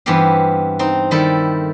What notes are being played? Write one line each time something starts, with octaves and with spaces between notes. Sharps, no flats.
G2 E3 B3 C4 G4 F5
C4 D#4
D#3 G3 E4 A4